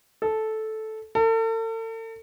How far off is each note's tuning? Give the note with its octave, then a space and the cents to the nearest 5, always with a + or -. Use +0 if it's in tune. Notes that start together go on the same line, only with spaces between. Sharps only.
A4 -10
A4 +40